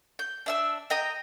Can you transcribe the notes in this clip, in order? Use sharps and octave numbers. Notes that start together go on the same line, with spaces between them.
G6
D4 E5 E6
D#5 G5 A#5 D#6